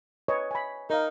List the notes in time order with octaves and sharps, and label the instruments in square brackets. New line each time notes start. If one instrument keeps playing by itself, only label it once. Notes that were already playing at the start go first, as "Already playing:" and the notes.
[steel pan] B4 C#5 D#5
G#5 B5
[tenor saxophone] D#4 [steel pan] A#4 F5